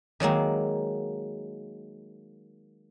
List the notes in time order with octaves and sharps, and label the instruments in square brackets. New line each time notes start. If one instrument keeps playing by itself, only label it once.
[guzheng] D#3 F#3 G#3 A#3